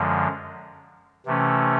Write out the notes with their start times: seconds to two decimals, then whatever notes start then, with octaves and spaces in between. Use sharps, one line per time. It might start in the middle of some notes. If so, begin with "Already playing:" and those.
Already playing: F#2 D3 F3 G#3
1.26 C3 E3 A3 C#4